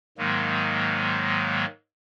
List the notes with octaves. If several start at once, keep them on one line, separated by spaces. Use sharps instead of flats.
G#2 D#3 F#3 G#3 A#3